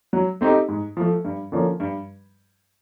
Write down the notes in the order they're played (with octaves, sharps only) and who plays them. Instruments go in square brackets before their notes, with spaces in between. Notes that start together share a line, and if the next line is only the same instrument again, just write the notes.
[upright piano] F#3
A3 C4 D#4 G4
G#2
F3 A3
G2
D3 F3 A#3 C#4
G2